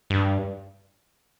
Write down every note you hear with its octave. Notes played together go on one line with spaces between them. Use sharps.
G2